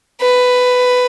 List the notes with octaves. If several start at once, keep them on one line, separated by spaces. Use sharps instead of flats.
B4